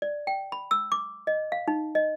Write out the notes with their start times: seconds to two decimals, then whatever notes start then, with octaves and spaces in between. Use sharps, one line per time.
0.02 D5
0.27 G5
0.52 B5
0.71 E6
0.92 D6
1.27 D#5
1.52 F5
1.68 D#4
1.95 D#5